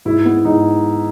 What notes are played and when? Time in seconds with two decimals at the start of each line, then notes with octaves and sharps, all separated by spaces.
0.05 G#2 E4
0.25 B3
0.45 G#2 D#4